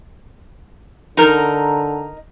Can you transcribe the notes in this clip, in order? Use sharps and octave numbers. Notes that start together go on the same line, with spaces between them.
D3 D#4 A#4